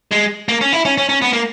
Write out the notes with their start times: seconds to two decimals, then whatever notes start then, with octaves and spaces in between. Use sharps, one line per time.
0.12 G#3
0.48 A#3
0.61 C#4
0.73 E4
0.85 C#4
0.98 C#4
1.09 C#4
1.22 B3
1.33 A#3